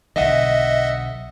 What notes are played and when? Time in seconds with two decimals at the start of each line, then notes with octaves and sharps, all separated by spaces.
0.16 B1 D3 D#5 E5 F#5